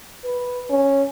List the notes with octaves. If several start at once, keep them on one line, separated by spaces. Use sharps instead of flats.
B4
C#4